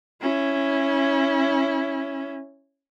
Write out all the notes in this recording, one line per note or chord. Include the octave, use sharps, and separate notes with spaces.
C#4 E4